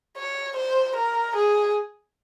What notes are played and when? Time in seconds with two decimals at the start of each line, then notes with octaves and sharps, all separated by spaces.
0.17 C#5
0.56 C5
0.96 A#4
1.36 G#4